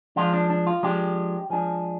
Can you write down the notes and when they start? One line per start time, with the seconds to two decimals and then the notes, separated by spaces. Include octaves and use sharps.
0.16 F3 G#3 D4 F4
0.34 D4
0.50 D4
0.67 F4
0.83 F3 G#3 D4 G4
1.50 F3 G#3 D4 G#4